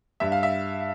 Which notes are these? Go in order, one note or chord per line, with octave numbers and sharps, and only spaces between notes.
G2 E5
F5
E5